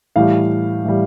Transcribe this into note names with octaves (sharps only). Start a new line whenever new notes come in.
A2 E3 G3 F5
A2 E3 G3